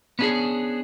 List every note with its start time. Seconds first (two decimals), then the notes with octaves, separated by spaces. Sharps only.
0.19 B3 C#4 D4 E4 G#4